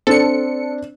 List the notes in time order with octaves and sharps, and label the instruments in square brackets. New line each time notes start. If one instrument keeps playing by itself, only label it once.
[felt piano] C4 D4 [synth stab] A4 C#7